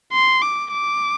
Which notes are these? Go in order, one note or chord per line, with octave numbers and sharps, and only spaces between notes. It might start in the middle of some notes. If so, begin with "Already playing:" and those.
C6
D6
D6